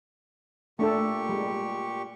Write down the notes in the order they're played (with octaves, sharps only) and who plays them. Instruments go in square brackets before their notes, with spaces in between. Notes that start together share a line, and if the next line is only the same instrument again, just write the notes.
[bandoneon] A#2 G4 C#6 [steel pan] A3 D4 A4
[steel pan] G3 G#3